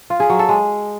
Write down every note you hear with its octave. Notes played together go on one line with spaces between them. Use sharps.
F4
G#4
F#3
A4
G#3